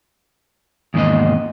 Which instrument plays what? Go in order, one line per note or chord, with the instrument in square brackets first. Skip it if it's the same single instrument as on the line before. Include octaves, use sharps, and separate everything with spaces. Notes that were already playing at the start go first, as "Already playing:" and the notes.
[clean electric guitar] E2 G#2 D#3 A#3 C4 D#5